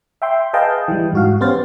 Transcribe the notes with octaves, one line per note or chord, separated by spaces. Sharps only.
E5 G5 C6
G#4 B4 D#5 F5 G5 A5
E3 G3
G#2 F#4 F5
B3 C#4 G4 C5 F5 A6